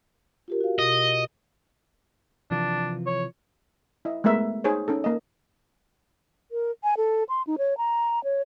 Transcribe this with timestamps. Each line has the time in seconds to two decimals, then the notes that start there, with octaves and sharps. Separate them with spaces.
0.48 F4 G4 A#4
0.61 F#4 F5
0.79 B2 D#5
2.51 C3 E3 F3 D4
3.07 C#5
4.05 E4 D#5
4.24 G#3 A3 B3 A#4 E5
4.64 D#4 G#4 C5 C#5
4.88 C#4 D#4 A4
5.04 A#3 D#5
6.51 A#4
6.83 G#5
6.97 A4
7.29 C6
7.47 D#4
7.58 C#5
7.78 A#5
8.24 C#5